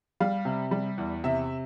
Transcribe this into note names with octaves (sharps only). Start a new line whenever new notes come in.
G3 F5
C3
G3
E2
C3 E5